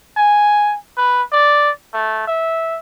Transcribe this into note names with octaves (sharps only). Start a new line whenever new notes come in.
G#5
B4
D5
A3
E5